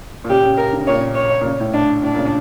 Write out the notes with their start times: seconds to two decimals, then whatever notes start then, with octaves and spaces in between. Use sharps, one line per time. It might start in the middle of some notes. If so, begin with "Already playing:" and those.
0.24 A#2
0.29 C#3 G4
0.43 C#3
0.58 A#4
0.73 D3
0.80 C#3
0.87 A#2 C#5
0.96 C#3
1.16 C#5
1.41 A#2
1.45 C#3
1.60 A2
1.74 D4
2.03 A2 D4
2.14 A#2
2.18 C#3